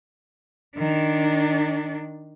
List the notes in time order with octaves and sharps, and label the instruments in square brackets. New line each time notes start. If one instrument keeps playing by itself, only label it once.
[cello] D#3 D4